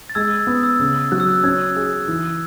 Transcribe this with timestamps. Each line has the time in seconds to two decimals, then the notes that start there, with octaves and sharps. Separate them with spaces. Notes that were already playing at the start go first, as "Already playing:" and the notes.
0.10 A6
0.15 G#3 E6 G#6
0.31 E6
0.47 B3 D#6
0.63 E6
0.79 C#3 E6
1.12 F#3 F#6
1.20 E6
1.29 F#6
1.44 C#4 E6 G#6
1.76 G#4
2.08 E3